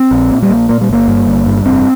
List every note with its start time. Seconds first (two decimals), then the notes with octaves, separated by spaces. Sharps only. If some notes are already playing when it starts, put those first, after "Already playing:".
Already playing: C4
0.11 A#1
0.30 A#2
0.42 G3
0.50 A#1 A#3
0.69 A#2 A#3
0.81 G3
0.89 G1 A#3
1.08 G2
1.27 G1
1.46 G2
1.66 F1 C4